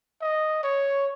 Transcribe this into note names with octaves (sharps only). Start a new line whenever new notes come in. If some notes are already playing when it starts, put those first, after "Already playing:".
D#5
C#5